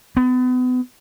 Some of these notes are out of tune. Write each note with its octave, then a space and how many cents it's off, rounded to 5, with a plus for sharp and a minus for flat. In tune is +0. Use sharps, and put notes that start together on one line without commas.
B3 +35